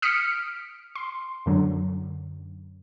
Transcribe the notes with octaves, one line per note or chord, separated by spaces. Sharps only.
D#6 F6 B6 C#7 D7
C6
F#2 D3 F#3